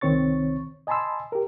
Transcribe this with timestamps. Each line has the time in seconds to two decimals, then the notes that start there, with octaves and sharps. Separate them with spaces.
0.01 C2 D#3 C4 C#5 C#6 A6
0.87 D#5 G#5 A5 B5 C6 E6
1.32 G4 A#4